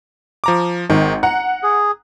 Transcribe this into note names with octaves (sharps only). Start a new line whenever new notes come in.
F3 A#5 D6
G#1 D#3
F#5 A#5
G#4